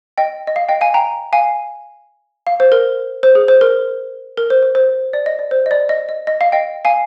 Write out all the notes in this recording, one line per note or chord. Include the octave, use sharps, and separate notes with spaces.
D#5 G5
D#5
F5
D#5 G5
F5 G#5
G5 A#5
F5 G#5
F5
C5
A#4
C5
G#4
C5
A#4
A#4
C5
C5
C5
D5
D#5
D5
C5
D#5
D5
D#5
D#5
D#5
F5
D#5 G5
F5 G#5